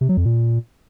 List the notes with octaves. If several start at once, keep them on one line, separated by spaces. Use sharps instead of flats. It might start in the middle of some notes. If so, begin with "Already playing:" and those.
C3
F#3
F2
A#2